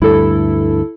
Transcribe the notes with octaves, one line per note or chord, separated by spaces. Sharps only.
D2 G2 E4 A4